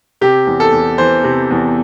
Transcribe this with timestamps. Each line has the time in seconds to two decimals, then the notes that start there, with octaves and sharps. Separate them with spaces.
0.21 C3 G4
0.47 E2
0.60 A4
0.72 E2
0.98 E3 C5
1.24 C3
1.51 E2